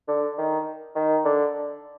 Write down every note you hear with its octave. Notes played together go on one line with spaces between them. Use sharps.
D3
D#3
D#3
D3